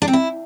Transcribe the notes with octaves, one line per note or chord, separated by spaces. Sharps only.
D4
C4
E4